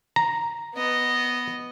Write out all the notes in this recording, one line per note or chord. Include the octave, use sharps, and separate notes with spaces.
A#5
B3 D#5